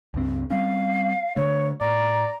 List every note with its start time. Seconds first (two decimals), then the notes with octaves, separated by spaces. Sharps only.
0.14 C#2 G2 C4
0.50 G3 C4 C#4 F5
1.36 D3 A3 C#5
1.81 A2 D5 A#5